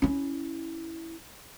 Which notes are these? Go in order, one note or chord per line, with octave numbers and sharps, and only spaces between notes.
C#4 E4